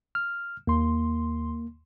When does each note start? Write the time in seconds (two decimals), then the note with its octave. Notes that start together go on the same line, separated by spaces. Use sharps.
0.15 F6
0.67 D#2 A#3 C6